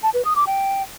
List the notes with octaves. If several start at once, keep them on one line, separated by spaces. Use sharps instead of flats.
A5
B4
D#6
D6
G5